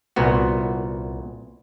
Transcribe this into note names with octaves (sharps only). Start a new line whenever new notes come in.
C2 A#2 B3 F#4